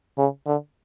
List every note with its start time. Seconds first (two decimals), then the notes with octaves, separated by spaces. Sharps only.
0.18 C#3
0.47 D3